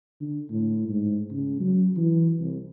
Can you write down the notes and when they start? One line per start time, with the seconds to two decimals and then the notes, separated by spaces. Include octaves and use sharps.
0.21 D3
0.50 A2
0.89 G#2
1.31 C#3
1.60 F#3
1.97 E3
2.39 C2